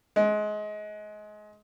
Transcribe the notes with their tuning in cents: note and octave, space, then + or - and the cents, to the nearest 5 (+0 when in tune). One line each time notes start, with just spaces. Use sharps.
G#3 +25